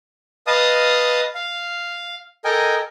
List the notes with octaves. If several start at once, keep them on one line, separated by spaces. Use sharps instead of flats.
B4 D#5 F5 A5 D#6
F5
A4 A#4 D#5 G5 G#5